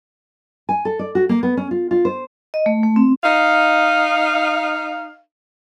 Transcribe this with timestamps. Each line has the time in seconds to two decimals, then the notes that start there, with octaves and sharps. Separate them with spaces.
0.69 G#5
0.85 A4
0.99 D5
1.15 F#4
1.29 A#3
1.43 B3
1.57 C#4
1.71 F4
1.91 F4
2.05 C5
2.54 D#5
2.66 A3
2.83 A3
2.96 C4
3.23 D#4 F5